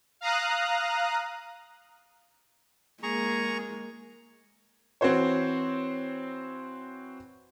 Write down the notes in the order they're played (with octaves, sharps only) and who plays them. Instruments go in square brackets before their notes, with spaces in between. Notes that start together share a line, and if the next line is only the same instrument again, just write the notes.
[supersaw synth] F5 A#5 D#6 F#6
[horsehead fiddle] G#3 A#3 [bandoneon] G#4 A#5 C#6
[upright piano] E3 C4 F#4 C5 C#5